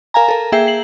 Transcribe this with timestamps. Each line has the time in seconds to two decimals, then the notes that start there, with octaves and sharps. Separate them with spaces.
0.14 A#4 F5 G#5 A#5
0.28 A4 A#4
0.52 A#3 G#4 E5 G5 C7
0.67 C7 F#7